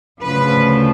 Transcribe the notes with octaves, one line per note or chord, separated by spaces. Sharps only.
D2 C#3 F3 B4